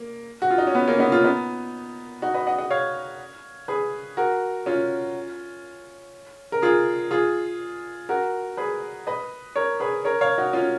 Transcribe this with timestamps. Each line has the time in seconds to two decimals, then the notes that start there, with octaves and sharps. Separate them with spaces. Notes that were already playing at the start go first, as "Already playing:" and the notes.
Already playing: A#3
0.42 F#4
0.51 F4
0.58 D#4
0.67 C#4
0.75 B3
0.87 A#3 C#4
0.99 B3 D#4
1.12 C#4 F4
1.24 B3 D#4
2.22 D#4 F#4
2.34 B4 D#5
2.47 D#5 F#5
2.58 D#5 F#5
2.70 C#5 F5
3.68 G#4 B4
4.17 F#4 A#4
4.66 C#4 F4
6.52 A#4
6.62 F4 G#4
7.11 F4 G#4
8.09 F#4 A#4
8.57 G#4 B4
9.07 B4 D#5
9.56 A#4 C#5
9.80 G#4 B4
10.05 A#4 C#5
10.21 C#5 F5
10.38 D#4 F#4
10.53 C#4 F4